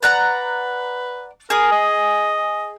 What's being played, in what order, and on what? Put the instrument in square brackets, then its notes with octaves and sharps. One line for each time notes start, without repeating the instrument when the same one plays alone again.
[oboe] B4 [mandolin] D5 F#5 A#5
[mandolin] G#4 D#6 [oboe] A#4
[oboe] D#5